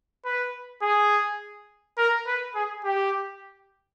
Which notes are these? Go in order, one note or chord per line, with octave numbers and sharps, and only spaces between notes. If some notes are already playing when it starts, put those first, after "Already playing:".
B4
G#4
A#4
B4
G#4
G4